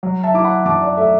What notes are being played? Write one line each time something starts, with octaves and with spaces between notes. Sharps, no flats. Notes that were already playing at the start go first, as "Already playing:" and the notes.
F#3
E5 A5
E4 D6
F#5 B5
F#2 A5 D6
D5
A3 E5